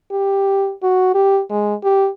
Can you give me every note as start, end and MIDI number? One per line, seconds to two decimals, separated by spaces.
0.11 0.72 67
0.83 1.13 66
1.14 1.41 67
1.50 1.74 56
1.83 2.08 67